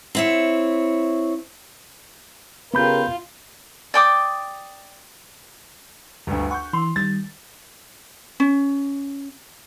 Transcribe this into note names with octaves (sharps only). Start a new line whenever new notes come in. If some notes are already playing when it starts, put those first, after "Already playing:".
C4 E4 C#5
C#3 B3 F4 G4 A#4 B5 G6
D5 G5 D6 D#6
G1 D2
F#5 C#6 G6
E3 C6
D#3 G3 A6
C#4